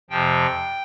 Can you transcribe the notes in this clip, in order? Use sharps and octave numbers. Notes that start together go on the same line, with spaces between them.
F2 C3 F3 G5